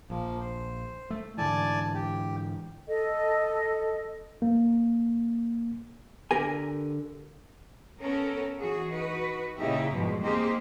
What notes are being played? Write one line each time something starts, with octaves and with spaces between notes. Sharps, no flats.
A#1 F3 A#3
C5
A3
G#2 D3 E3 D5 G#5 A5
G4
A4 D#5
A#3
D3 G4 A#4 G#5
B3 C#4 A4 A#4
E3 F#4 G#4
D#4 F#4 B4
A#2 C#3 D#4 E4 G4 E5
F2 G#2 B2 F3 G3 G#3
A#3 C4 D#4 G4 G#4 C5